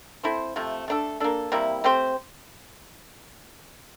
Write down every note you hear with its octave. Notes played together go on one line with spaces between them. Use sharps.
C4 E4 A4 C5
C3 F3 A3
A3 D4 A4
A#3 D4 A4
C3 G3 A#3 E4
A3 C4 G4 C5